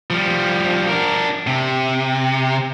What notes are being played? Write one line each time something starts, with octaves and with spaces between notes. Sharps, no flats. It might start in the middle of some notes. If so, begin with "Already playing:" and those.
F3 G3
D4 A#4
C3